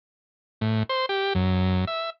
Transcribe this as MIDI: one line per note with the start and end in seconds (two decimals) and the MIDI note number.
0.61 0.83 45
0.89 1.06 72
1.09 1.33 67
1.35 1.85 42
1.87 2.10 76